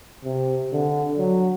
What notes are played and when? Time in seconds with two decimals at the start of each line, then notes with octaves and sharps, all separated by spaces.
0.24 C3
0.72 D3
1.18 F#3